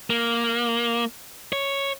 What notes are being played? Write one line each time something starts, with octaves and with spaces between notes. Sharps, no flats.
A#3
C#5